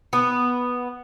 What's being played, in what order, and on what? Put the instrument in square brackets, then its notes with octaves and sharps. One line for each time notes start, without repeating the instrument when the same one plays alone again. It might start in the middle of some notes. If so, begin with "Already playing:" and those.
[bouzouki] B3